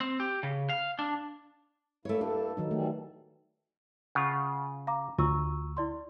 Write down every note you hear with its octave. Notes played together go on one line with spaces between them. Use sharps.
C4
G4
C#3
F5
D4
G2 A3 A#3 E4 C#5
D4 A4
D#3 F#3 D#4
E3 G3 A3
C#3 F4 F#5 C#6
F5 A#5 D6
D2 F4 G#5 C#6 E6
E4 D5 C6